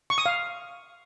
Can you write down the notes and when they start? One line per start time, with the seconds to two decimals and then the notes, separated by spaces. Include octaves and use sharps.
0.10 C#6
0.18 D#6
0.26 F5